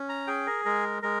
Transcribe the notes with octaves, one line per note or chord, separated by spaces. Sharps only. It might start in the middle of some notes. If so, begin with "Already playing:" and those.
Already playing: C#4
A#5
G#4 G5
A#4
G#3 A#4
G#3 A#4